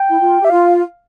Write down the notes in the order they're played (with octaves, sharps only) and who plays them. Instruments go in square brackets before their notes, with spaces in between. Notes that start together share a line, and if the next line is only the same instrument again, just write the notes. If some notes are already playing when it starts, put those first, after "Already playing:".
Already playing: [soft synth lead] G5
[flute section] E4
F4
[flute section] G4 [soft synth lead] E5
[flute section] F4 [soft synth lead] F5